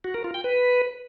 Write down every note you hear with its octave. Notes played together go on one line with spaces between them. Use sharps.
F#4
A#4
F4
G5
B4